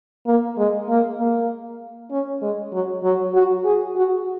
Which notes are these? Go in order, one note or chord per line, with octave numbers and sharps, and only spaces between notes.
A#3
G#3
A#3
A#3
C#4
G#3
F#3
F#3
F#4
G#4
F#4